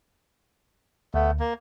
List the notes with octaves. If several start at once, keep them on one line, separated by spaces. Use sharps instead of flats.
D2 A3 B3
A#3